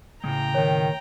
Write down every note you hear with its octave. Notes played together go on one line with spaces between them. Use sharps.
A2 C#3 G#3 G5 A#5
D#3 C#5